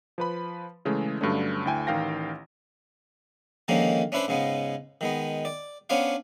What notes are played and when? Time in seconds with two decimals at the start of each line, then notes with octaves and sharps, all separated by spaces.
0.18 F3 B4 B5
0.85 C#3 E3 G#3 A3
1.21 G2 D3 F#3 A3 C#4
1.65 D2 E4 G5 G#5
1.87 A1 D#3 F5 G5 A#6
3.68 D3 D#3 F3 G#3 A#3 C#4
4.12 C#4 D4 E4 B4 C5
4.28 G#2 C#3 G#3 B3
5.01 D#3 G#3 B3
5.45 D5
5.90 B3 C#4 D4 C5 C#5 F5